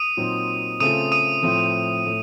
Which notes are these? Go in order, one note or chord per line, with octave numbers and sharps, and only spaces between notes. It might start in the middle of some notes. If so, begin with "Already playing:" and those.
Already playing: D#6 D#7
A#2 F#3 C4 D#4 F#4
C#3 A3 C4 F4 A4 D#6 D#7
D#6 D#7
A2 F3 A3 C4
A2 A3